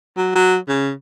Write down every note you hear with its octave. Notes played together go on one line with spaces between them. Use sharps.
F#3
F#3
C#3